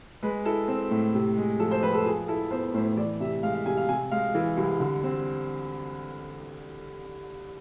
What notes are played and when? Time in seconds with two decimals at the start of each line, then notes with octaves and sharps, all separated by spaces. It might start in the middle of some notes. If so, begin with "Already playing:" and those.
0.23 G#3 B4
0.45 E4 A4
0.68 C4
0.91 A2
1.14 C3
1.37 G#3
1.60 F3 A4
1.71 C5
1.83 F2 B4
1.95 A4
2.05 F3 G#4
2.28 E4 A4
2.51 B3 C5
2.74 A2 C5
2.97 E3 D5
3.20 C3 E5
3.43 G#3 F5
3.55 F5
3.66 C3 G#5
3.77 F5
3.89 C3 G#5
4.12 G#3 F5
4.35 E3
4.57 C2
4.80 D3
5.03 C4